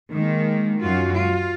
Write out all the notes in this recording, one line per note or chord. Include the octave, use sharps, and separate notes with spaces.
D#3 G#3 A#3
F#2 F4 F#4
F4